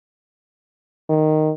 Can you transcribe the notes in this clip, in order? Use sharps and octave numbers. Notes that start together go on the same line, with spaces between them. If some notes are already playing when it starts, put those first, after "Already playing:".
D#3